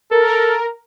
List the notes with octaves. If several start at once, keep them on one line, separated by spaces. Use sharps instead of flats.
A4 A#4